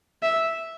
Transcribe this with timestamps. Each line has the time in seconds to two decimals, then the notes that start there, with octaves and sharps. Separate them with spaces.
0.22 E5